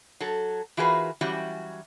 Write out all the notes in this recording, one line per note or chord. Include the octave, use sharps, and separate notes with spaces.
F#3 A4
E3 F4 F#4 G#4 A#4 B4
E3 F#3 G3 C#4 F#4 G4